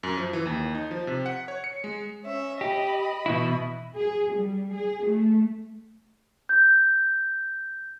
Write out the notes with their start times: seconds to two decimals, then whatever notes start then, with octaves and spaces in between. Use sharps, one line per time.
0.03 F#2
0.17 F3
0.33 E3
0.46 D#2
0.75 D#4
0.91 F3
1.07 C3
1.26 F#5
1.48 C#5
1.64 C#7
1.84 G#3
2.24 C#4 E5
2.61 G4 D#5 B5
3.26 B2 E3 E4
3.96 G#4
4.35 G3
4.74 G#4
5.06 A3
6.49 G6